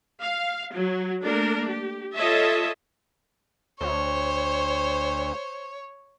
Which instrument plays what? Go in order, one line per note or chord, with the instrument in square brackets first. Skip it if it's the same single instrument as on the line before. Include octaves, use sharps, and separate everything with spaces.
[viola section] F5
F#3
A3 A#3 D4 A#4
G4
F4 A4 C#5 D#5 E5 A5
[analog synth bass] D2 [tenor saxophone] C5 [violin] C#5